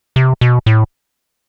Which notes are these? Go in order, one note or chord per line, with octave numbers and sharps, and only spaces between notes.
C3
B2
A2